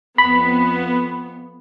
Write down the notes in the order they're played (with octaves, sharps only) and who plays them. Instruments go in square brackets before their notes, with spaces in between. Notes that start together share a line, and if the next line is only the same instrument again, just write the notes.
[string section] F2 B3 [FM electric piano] B5